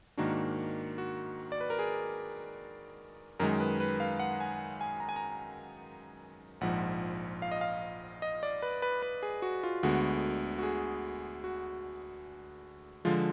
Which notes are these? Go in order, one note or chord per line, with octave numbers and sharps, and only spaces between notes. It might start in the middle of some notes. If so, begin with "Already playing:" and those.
G#2 D#3 A#3 D4 F#4
F#4
D5
B4
A#4
G#4
F#2 D#3 G#3 A#4
B4
B4
F5
F#5
G#5
G#5
A#5
G#5
A#5
A#1 G#2 F3 F#5
F5
D#5
F5
D#5
D5
B4
B4
B4
G#4
F#4
F4
D2 D3 G#3 B3 F#4
F#4
G#4
F#4
D3 F3 G#3 F4